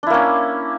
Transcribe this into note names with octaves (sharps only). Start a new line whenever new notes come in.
A#3 C#4 D4 E4